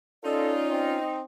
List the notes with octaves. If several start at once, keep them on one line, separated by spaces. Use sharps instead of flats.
C#4 D#4 F4 A4 D5
C4